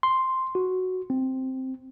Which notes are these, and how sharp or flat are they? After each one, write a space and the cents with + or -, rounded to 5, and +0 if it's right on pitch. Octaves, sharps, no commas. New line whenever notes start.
C6 +0
F#4 +0
C4 +0